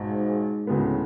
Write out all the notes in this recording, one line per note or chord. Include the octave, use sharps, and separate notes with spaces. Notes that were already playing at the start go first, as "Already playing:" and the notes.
Already playing: B1 G#2 B2 G#3
D2 A2 C#3 G#3 B3